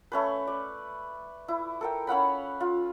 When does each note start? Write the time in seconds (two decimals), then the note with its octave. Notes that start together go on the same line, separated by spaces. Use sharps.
0.12 A3 C#4 B4
0.47 D5
1.48 E4
1.81 A4 A#4 G5
2.07 C#4 F5 F#5 B5
2.60 F4